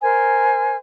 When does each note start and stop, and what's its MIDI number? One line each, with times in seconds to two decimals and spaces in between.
0.02 0.76 70
0.02 0.76 72
0.02 0.76 80